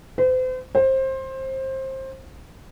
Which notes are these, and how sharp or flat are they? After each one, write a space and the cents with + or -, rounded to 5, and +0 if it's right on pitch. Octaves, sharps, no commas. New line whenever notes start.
C5 -40
C5 +20